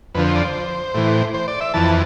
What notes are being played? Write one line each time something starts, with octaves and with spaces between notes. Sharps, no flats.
F2 D3 F3 B4
C5
D5
C5
A2 E3
C5
D5
E5
F2 E3 A5